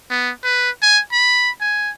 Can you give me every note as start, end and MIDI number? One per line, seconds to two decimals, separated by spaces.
0.10 0.31 59
0.44 0.70 71
0.82 1.01 80
1.12 1.50 83
1.61 1.91 80